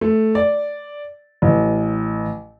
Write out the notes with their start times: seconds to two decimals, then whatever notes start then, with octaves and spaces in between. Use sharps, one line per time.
0.01 A3
0.35 D5
1.42 A1